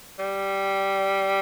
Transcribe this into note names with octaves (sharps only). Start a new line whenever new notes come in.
G3